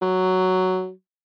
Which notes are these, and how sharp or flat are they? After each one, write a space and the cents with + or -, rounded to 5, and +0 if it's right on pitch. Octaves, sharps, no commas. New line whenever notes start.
F#3 +5